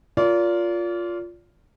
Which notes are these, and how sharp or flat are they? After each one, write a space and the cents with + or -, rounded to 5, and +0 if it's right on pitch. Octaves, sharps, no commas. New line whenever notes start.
F4 +0 A#4 +0 D5 -35